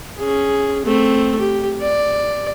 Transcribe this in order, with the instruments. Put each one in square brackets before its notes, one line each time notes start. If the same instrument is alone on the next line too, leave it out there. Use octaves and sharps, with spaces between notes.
[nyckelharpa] C#4 G#4
A3 C4
G4
D5